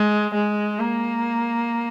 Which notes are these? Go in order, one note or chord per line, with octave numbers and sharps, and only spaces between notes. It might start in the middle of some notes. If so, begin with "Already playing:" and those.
Already playing: G#3
G#3
A#3